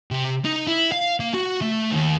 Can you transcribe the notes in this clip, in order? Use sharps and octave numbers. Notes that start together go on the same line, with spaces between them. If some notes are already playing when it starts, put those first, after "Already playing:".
C3
D#4
E4
F5
A#3
F#4
A3
D#2